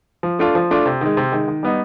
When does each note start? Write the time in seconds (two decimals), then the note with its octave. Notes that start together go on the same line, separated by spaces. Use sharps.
0.23 F3
0.39 A3 D4 F4
0.55 F3
0.71 A3 D4 F4
0.86 C3
1.01 D#3 G#3
1.17 C3
1.32 D#3 G#3
1.48 D#3
1.63 G3 B3 D#4